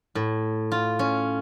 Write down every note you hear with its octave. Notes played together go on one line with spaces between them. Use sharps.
A2
F4
C#4